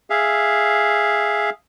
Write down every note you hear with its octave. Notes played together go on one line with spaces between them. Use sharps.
G#4 E5 F5